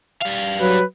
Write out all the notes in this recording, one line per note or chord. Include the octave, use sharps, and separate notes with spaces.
G3 F5
F#3 B4